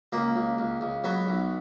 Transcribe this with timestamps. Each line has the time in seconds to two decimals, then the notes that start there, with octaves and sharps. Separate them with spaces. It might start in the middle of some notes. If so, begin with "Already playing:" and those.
0.12 C#2 A#3
0.36 C#2
0.58 C#2
0.81 C#2
1.04 F#3 B3
1.27 B1